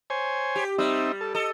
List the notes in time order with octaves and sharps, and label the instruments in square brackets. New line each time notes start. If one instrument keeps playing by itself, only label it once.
[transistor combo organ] C5 C#5 G#5
[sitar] G4
[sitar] G3 [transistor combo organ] C4 D#4 E5
[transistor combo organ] A4
[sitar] A4 [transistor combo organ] D#5